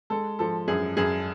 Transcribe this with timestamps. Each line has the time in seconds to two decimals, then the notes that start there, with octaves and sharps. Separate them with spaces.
0.10 G#3 A4
0.39 F3 A4
0.68 F#2 G#4
0.97 F#2 G#4